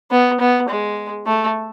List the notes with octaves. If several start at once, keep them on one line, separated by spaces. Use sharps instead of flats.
B3
B3
G#3
A3